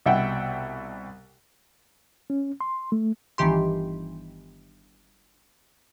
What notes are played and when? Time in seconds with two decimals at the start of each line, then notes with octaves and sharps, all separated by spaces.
0.06 C2 B2 E5 F#5 G5
2.30 C#4
2.61 C6
2.92 A3
3.38 G1 D#3 E3 G4 C6